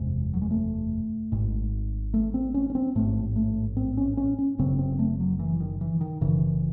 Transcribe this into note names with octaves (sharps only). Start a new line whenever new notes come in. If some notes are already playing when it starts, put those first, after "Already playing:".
Already playing: F#1 E2 C3 G#3
F#3
G#3
A3
G#1 G#2
A3
C4
C#4
C#4
C4
A1 G#2 A3
A3
C4
C#4
C#4
C#4
F#1 F#2 C#3 C4
C4
A3
F#3
E3
D#3
E3
D#3
F#1 F#2 C#3 E3